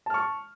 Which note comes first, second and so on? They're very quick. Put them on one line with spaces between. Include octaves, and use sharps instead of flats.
A5 F6 C#6